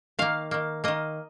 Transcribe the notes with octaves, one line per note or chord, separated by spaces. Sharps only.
D#3 A#3 F5
D#3 A#3
D#3 A#3 D#5